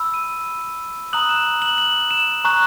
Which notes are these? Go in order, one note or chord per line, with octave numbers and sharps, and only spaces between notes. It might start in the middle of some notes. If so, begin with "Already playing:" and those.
Already playing: B5 E6
D#7
A#5 D#6 F#6 F#7
E7
F#7
F#7
E7
A#5 C#6 F#6